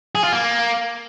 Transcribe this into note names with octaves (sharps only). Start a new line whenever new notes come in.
G#4
F4
A#3